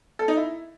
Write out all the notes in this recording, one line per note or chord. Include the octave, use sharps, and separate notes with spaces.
A4
D#4
E4